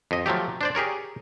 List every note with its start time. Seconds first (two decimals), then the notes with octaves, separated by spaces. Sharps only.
0.11 F2 D#5
0.26 F3 F#3 A3 G4
0.61 D4 C5 D5
0.75 G4 G#4 A#4 C#5